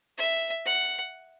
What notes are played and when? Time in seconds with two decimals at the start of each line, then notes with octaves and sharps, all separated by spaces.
0.18 E5
0.66 F#5